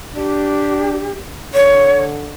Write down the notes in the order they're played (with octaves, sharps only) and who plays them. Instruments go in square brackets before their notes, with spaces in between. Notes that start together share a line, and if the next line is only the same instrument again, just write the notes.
[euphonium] D4 [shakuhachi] G4
[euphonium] D3 [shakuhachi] C#5